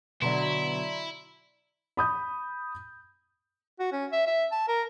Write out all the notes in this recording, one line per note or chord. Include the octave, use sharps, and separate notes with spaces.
B2 D3 F#3 E4 D5 A#5 C6
B5 D#6 G6
F#4
C#4
E5
E5
A5
A#4